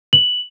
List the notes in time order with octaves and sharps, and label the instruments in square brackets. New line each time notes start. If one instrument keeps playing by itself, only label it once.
[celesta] F#7